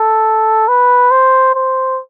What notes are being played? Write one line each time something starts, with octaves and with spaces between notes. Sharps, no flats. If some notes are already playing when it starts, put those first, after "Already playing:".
Already playing: A4
B4
C5
C5